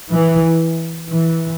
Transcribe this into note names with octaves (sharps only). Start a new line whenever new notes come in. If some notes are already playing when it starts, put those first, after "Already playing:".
E3
E3